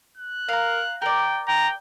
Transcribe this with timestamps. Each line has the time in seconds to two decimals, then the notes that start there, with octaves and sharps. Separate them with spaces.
0.17 F#6
0.49 A#4 F5 A#5
1.02 A#4 D5 G5
1.48 G5 A#5